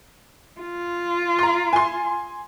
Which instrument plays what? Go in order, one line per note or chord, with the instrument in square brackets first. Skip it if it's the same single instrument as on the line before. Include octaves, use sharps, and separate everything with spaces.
[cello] F4
[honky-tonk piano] A#5 C6
G#5 C6